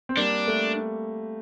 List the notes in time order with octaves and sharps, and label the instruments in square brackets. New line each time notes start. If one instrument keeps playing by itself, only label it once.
[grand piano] C4
[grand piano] G3 A#3 [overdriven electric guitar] D4
[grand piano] A3